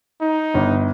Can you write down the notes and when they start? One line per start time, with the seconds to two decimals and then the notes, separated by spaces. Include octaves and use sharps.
0.21 D#4
0.54 G1